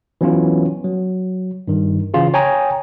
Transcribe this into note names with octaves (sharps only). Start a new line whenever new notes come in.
E3 F#3 B3 C#4 F4
F#3
G2 D#3
C#3 E3 C#4 F4 G#4
C#5 G5 G#5 A#5 D#6